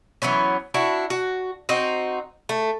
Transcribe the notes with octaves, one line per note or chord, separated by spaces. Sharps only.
E3 F#3 B3 C#4
D4 E4 F#4
F#4
C4 D#4 F#4
A3